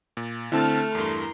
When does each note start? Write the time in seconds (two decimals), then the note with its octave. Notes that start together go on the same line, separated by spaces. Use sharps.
0.17 A#2
0.52 D3 A3 C4 E4 A4 A5 F6
0.95 E2 G2 A#4 C6